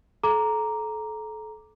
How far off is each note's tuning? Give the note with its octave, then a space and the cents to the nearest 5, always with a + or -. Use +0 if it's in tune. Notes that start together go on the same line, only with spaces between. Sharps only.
A4 -30 A#5 +0 D6 +0